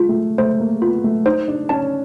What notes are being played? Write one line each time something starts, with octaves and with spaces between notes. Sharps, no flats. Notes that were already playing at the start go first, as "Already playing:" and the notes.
Already playing: G#3 F4
A3
A3 C5
A#3
B3 F4
A3
D#4 C5
D4
C#4 A5